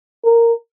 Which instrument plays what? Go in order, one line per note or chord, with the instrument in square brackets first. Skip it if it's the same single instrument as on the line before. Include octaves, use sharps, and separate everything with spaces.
[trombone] A#4